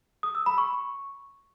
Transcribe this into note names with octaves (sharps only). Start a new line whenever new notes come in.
D#6
E6
B5
C#6